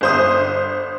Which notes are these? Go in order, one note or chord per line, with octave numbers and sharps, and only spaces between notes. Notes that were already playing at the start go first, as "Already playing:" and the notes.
G1 C5 D#6